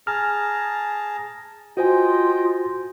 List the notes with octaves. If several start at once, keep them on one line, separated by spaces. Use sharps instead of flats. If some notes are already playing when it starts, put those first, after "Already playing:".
G#4 A5 A#5 F6
F4 F#4 C5 D#5 G5 G#5